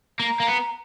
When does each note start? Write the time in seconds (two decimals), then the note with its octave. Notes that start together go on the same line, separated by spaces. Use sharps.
0.20 A#3 A#5
0.40 A#3
0.48 B3